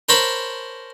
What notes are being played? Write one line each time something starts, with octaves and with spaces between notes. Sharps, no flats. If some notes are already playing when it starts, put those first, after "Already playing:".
A#4 C5 C#5 A5 B5